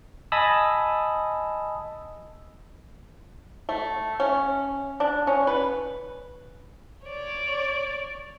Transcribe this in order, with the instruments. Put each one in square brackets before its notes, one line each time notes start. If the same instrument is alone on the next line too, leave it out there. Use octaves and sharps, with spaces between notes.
[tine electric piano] D#5 G#5 A5 B5 D#6 E6
[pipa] A3
C#4
D4
C#4
B4
[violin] C#5 D5